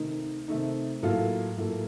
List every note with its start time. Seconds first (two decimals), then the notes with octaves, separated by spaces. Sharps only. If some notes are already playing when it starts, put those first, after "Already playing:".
Already playing: C3 D#3 A3 D#4
0.48 C3 D#3 A3 D#4
1.03 A2 F#3 A#3 F4 A4
1.57 A2 F#3 A#3 F4 A4